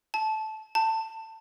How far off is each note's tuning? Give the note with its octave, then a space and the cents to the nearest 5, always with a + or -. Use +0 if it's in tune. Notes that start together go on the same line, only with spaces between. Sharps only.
A5 -15
A5 +20